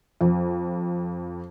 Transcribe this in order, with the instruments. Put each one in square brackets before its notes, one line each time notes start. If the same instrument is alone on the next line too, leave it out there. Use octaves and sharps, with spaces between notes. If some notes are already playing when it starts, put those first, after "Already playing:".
[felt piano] F2